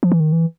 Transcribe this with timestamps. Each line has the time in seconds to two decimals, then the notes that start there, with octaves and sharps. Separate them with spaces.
0.03 F3
0.12 E3
0.20 D#3
0.32 E3